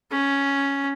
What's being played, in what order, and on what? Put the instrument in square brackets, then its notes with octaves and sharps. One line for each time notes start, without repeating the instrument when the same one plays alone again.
[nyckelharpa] C#4